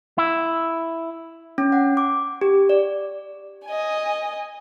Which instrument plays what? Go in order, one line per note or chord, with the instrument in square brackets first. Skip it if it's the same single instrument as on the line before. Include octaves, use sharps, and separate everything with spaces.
[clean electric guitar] E4
[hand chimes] C#4
F#5
D6
G4
D5
[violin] D#5 G#5